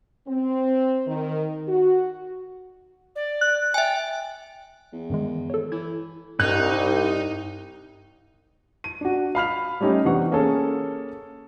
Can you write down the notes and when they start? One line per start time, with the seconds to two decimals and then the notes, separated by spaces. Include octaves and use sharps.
0.28 C4
1.07 D#3
1.67 F#4
3.16 D5
3.41 F#6
3.74 E5 G5 G#5
4.93 E2
5.10 G2 D#3 G#3
5.50 A4 C#5
5.72 E3 G#6
6.40 C2 G2 D#4 F#6
8.84 D#7
9.01 D4 F#4
9.35 F5 B5 F6 F7
9.81 G3 A3 C#4 D#4 G4
10.05 C3 E3 B3 D4 F#5 C#6
10.32 A#3 C#4 G#4 A4